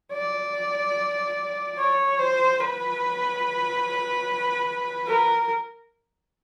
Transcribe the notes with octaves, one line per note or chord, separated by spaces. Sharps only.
D5
C#5
C5
B4
A#4